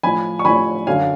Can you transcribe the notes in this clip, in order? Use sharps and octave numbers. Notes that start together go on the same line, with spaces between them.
A2 F3 G#5 B5
C#6
A2 F3 G#5 B5
F#2 D3 F#3 F5 G#5